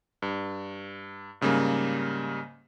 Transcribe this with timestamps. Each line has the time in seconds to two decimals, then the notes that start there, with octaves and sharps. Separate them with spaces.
0.22 G2
1.41 G#2 C#3 G3 A#3